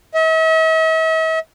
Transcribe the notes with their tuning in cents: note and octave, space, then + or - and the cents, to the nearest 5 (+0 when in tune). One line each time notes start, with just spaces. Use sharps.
E5 -45